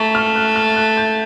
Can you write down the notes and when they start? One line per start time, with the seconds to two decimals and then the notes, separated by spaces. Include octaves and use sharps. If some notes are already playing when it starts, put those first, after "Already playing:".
Already playing: A3 A#5 C#6
0.15 F6
0.36 F#6
0.56 F6
0.76 F#6
0.97 G6